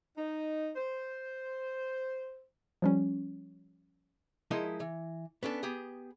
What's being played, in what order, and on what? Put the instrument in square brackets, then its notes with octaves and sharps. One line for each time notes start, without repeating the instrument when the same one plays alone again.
[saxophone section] D#4
C5
[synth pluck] F3 G3 C#4
[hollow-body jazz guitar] F3 G#3 D#4 E4 A#4 D#5
E3
B3 C#4 D4 A4
B3 G4 G#4